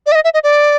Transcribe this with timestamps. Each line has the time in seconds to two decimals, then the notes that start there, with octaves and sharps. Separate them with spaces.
0.06 D5
0.12 E5
0.15 D#5
0.24 E5
0.34 D#5
0.44 D5